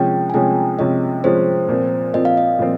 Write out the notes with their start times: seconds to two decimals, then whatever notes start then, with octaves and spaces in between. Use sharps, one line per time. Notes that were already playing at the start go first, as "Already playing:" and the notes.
Already playing: C3 F3 G#3 C#4 G5
0.30 G#5
0.34 C3 F3 G#3 C#4 G5
0.79 C3 F3 G#3 C#4 D#5
1.24 C3 F3 G#3 C#4 C5
1.69 A#2 F3 C4
2.14 A#2 F3 C4 D#5
2.25 F5
2.37 D#5
2.59 A#2 F3 C4